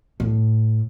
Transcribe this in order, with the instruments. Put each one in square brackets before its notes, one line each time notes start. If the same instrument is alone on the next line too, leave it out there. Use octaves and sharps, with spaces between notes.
[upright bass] A2